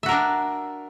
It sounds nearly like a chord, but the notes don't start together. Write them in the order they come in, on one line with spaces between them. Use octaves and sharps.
E5 F#4 A#4 D4